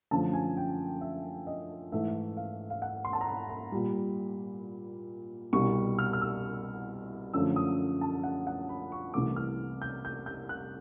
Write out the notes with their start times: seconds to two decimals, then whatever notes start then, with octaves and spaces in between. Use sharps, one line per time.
0.11 F#2 D3 F3 A3 A5
0.33 G#5
0.57 G5
1.01 E5
1.47 D#5
1.92 G#2 E3 A3 E5
2.37 F5
2.70 F5
2.82 F#5
3.05 C6
3.13 A5
3.21 A#5
3.28 B5
3.49 B5
3.72 A#2 G3
5.53 C2 B2 G3 C#6
5.99 F6
6.13 F6
6.21 E6
7.34 F#2 D3 F3 A3 E6
7.56 D#6
8.01 A5
8.24 F#5
8.47 F#5
8.69 B5
8.92 C#6
9.14 C2 C3 E3 A3 D6
9.36 F6
9.82 G6
10.05 G6
10.26 G6
10.49 F#6